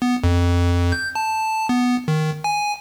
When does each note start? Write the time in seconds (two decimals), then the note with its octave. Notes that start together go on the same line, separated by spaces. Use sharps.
0.02 B3
0.24 F2
0.92 G6
1.15 A5
1.69 B3
2.08 D#3
2.44 G#5